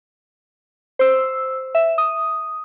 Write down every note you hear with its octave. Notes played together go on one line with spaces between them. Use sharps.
C5 E6
E5
D#6